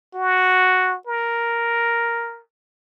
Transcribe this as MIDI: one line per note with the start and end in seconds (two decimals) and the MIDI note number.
0.14 0.97 66
1.07 2.40 70